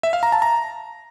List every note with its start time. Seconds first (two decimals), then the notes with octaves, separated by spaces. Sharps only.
0.03 E5
0.13 F5
0.23 A#5
0.32 A5
0.42 A#5